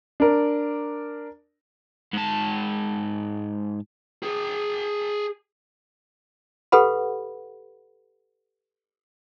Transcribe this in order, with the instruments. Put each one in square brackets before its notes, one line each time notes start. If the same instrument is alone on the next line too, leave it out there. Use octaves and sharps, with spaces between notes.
[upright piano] D4 A#4
[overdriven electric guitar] G#2 A5
[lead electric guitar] G#4 G5
[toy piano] G4 A4 B4 F#5 B5